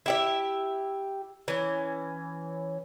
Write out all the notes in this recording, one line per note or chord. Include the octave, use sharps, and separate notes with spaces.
E4 G4 E5
E3 C#4